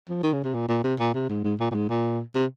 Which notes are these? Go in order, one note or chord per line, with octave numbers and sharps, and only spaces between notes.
F3
D#3
C#3
C3
A#2
A#2
C3
A#2
C3
G#2
G#2
A#2
A#2
G#2
A#2
C3